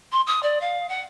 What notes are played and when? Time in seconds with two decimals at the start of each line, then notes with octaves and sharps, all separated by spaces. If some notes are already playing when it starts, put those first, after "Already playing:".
0.12 C6
0.27 D#6
0.43 D5
0.61 F5
0.89 F#5